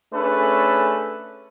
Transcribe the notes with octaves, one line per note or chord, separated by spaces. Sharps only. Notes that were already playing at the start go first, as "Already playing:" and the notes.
A3 C#4 D4 G#4 A4 B4